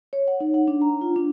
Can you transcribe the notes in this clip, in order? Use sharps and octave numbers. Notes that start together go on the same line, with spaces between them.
C#5
F#5
D#4
F#5
D4
A#5
F4
D4